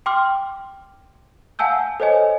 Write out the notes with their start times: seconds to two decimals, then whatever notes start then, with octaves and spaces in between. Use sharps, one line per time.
0.06 G5 C6 D6 F6
1.59 F5 F#5 G#5 A5 E6 G6
2.00 A4 C5 C#5 D#5 G#5